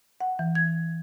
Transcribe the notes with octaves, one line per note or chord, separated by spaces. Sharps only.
F#5
E3
G#6